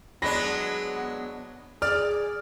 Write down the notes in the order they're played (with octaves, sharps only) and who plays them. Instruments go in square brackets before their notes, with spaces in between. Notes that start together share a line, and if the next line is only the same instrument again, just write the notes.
[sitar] F#3 G#3 D4 [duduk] B3 [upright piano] B5 A#6
[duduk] G#4 [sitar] D5 [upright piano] F6